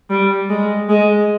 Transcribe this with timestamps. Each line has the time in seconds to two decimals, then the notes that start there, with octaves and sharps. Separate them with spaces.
0.10 G3
0.49 G#3
0.89 G#3